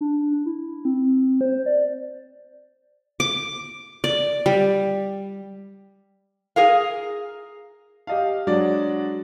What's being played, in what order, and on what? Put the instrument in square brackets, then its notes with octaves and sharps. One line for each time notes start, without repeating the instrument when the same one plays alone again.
[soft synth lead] D4
E4
C4
C5
D5
[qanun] D6
D5
G3
[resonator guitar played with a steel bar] G#4 A#4 F5
[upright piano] G4 D#5 F5
F#3 G#3 D4 F#4 D5